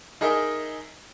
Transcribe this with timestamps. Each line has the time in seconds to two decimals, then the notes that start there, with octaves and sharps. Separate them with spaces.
0.21 D#4 G#4 A#4 D#5 E5